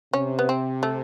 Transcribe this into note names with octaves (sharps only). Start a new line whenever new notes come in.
C3 C#4
B3
C4
A3